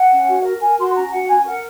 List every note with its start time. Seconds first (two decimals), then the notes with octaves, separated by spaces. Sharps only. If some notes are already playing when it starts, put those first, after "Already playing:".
Already playing: F#5
0.11 C#4
0.28 F#4
0.44 A#4
0.61 A#4 G#5
0.78 F#4 C6
0.95 C#4 A#5
1.11 F#4 F#5
1.28 C#4 G#5
1.45 A#4 F#5